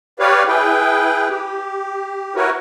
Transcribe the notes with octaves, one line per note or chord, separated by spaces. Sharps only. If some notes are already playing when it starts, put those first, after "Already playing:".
G4 B4 C#5 D5 F5
E4 G#4 B4 G5
G4
E4 F#4 A#4 B4 C#5